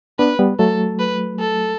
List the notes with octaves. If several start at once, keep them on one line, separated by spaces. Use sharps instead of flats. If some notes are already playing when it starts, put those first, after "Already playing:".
B3 D4 B4
G3 B3
F#3 A3 A4
B4
A4